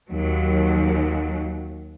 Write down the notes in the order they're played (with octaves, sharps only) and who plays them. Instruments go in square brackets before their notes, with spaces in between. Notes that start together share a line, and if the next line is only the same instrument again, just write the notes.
[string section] D#2 F#3